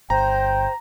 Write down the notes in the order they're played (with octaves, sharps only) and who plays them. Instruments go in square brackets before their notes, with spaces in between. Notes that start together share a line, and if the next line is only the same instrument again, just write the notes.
[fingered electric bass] G1 [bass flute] C5 [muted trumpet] G5 [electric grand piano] A#5